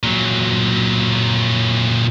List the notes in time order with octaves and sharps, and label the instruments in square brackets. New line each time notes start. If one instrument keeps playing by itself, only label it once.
[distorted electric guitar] A#2 F#3